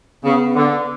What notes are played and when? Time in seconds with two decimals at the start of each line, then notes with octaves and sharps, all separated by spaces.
0.23 C#3 B3
0.54 D3